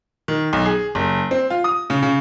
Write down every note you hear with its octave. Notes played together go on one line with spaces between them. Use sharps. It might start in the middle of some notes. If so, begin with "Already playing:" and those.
D#3
B1
G#4
F#1
C4
F4
D#6
C#3
C#3